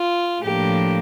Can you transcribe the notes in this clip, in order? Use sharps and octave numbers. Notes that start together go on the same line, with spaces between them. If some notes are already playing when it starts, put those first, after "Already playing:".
Already playing: F4
A2 F3 A#3 D4 G4